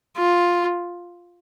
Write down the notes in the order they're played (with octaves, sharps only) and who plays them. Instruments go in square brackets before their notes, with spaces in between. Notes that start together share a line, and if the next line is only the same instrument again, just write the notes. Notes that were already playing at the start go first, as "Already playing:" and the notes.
[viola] F4